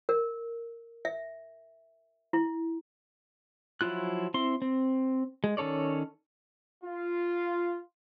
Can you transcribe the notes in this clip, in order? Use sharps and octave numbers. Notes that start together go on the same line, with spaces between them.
A#4
E5
E4
F3 F#3 E4 F4 F#6
C4 E4 C6
C4
G#3
D#3 C#4 A4 C#5 D5
F4